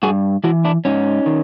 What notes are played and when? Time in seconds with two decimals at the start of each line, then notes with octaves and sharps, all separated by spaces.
0.03 G2 F#4 G#4
0.44 E3 E4 F#4
0.65 D4 E4
0.85 G#2 C#4 D#4
1.26 D#3